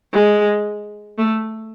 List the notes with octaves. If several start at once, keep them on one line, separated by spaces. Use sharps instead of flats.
G#3
A3